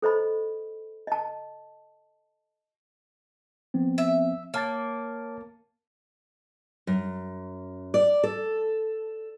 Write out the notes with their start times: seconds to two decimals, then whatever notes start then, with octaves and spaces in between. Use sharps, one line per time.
0.02 A4 C5 D#5 B5
1.07 D#5 A5
3.74 F3 B3 C4
3.98 E5
4.54 A#3 C#5 A5 A6
6.87 F#2
7.94 D5
8.23 A4